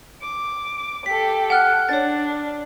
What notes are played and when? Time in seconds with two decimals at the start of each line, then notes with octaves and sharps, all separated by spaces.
0.22 D6
1.06 G4 A4 B6
1.50 F#5 F6 F#6
1.89 D4 C#5 A6